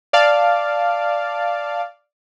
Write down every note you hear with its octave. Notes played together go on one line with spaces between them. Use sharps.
D5 F5 A5